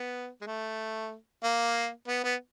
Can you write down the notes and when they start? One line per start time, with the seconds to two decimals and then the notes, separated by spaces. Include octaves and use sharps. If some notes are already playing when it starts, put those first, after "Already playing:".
Already playing: B3
0.41 G#3
0.47 A3
1.44 A#3
2.08 B3
2.24 B3